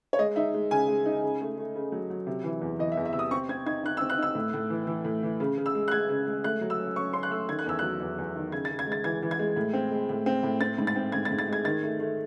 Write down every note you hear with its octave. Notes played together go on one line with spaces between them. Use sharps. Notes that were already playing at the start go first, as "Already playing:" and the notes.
C#5
G#3 D#5
D#4 E5
G#3
C#3 G#5
G#3
D#4
C#3
A3
A3
C#3
F#3
F#3
C3
E3
E2
E3 D#5
E5
E2
E5
C3 E6
D#6
C4 C#6
C4 G#6
D#4 G#6
D#4 F#6
E6
C4
F#6
D#4 E6
A2
A2
E3
E3
A2
E3
C#3
C#3
E6
G#3
F#6
G#3 G#6
C#3
G#3
A3 F#6
F#3
E6
C#4
C#4 C#6
C#4 C6
F#6
A3 E6
D#3 G#6
F#6
E2 E6
F#6
F#3
E2
E2
D#3
C#3 G#6
A6
C#3
G#6
G#3
A6
E3 G#6
E3
G#6
G#3
A2
C4
G#3
A2
C4
A2
C4 A6
G#2
A6
C4
G#2 G#6
A6
G#2
A6
G#3 G#6
D#3 A6
A3
A3